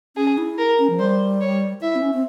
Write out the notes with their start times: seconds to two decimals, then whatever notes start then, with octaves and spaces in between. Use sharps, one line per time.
0.17 C#4 G#4
0.38 E4
0.58 A#4
0.79 C#4
0.90 F3
0.99 G3 C5
1.40 C#5
1.81 E4 E5
1.95 C4
2.02 C#4
2.13 C4